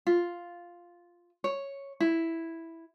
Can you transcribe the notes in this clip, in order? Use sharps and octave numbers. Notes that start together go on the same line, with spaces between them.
F4
C#5
E4